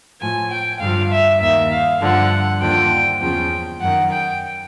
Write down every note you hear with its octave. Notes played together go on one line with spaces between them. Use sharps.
A2 F3 G#5
G5
G2 D3 F3 F5
E5
D#2 D#3 E5
F5
G2 D3 F3 F#5
D#2 D3 F3 G5
E2 C#3 F3 G5
F#2 D#3 F#5
G5